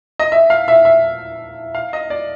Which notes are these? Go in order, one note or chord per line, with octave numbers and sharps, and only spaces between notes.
D#5
E5
F5
E5
E5
F5
D#5
D5